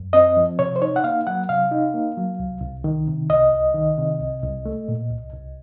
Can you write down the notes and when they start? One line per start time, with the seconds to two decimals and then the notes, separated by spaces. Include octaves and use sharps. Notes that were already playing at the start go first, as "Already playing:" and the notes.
Already playing: F#2
0.13 C4 D#5
0.37 F3
0.59 C3 C#5
0.76 C5
0.82 D#4 C#5
0.96 F#5
1.04 A#3 F5
1.27 F#3 F#5
1.49 C3 F5
1.71 D#4
1.94 A#3
2.17 F#3
2.40 C2
2.61 C2
2.84 D#3
3.07 C3
3.30 C2 D#5
3.52 C2
3.75 D#3
3.98 C3
4.21 C2
4.43 C2
4.66 A3
4.88 A#2
5.10 C2
5.33 C2